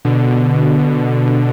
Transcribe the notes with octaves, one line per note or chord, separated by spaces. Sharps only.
B2 D3